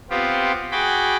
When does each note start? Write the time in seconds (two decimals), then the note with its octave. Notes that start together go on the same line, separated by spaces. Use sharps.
0.10 B3 C4 F4 G4
0.72 F#4 G#4 G5 B5 D6